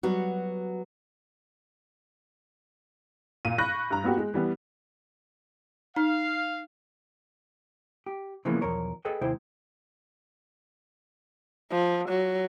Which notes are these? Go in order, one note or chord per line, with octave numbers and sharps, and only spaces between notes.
F#3 G3 B3 F#4
A#2 D#7
B5 C#6 F#6 G6 A#6
G2 A#5
A#3 B3 F#4 G4
G#3
E3 G3 B3
D#4 F5
G4
C#3 E3 F3 G#3 A#3 B3
B1 E2 F3 A#4 C#5
G#4 A4 B4 D#5 G5
D#2 C3 G#3 E4 C5 G5
F3
F#3